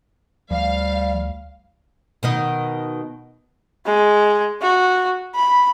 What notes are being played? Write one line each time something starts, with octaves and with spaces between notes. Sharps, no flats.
D2 F3 G3 F5
B2 D#3 D#4
G#3
F#4
B5